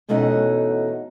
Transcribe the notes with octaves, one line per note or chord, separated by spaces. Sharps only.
E2 B2 A3 C#4 D#4 F#5